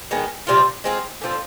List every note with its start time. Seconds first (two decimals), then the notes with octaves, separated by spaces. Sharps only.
0.11 D#3 G#3 B3
0.47 C3 G3 C4 F4
0.84 G#3 C4 F4 G#4
1.21 D3 F3 C4